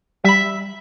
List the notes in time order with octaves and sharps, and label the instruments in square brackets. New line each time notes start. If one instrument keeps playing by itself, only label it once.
[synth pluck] G3 B5 [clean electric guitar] E5